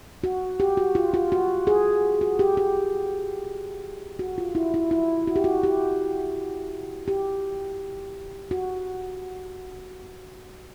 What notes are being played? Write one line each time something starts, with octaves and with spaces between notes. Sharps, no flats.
F#4
G4
F#4
F4
F4
F#4
G#4
F#4
G4
G4
F#4
F4
E4
E4
E4
F#4
G4
F#4
G4
G4
F#4